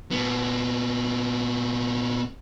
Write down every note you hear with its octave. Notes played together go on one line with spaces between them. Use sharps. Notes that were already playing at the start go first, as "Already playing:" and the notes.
A#2 B3